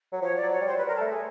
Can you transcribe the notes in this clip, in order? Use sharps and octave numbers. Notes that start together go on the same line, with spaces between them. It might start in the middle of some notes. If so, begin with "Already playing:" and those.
F#3
F3 C#5
D5
F#3
C#5
G3
C5
G3 B4
A#4
A4
A3
G#4